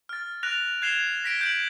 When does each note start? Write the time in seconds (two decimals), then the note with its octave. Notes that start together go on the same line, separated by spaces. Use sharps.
0.09 F6 A6
0.43 F#6 A#6 D7 F7
0.82 F#6 G#6 C7 E7 F7 G7
1.24 A#6 B6 D7 G7
1.41 G6 D7 F#7